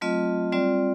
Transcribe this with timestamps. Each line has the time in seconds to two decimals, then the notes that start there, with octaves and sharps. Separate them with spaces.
0.01 F#3 A3 C4 F4 D#5
0.52 G3 C4 F4 D5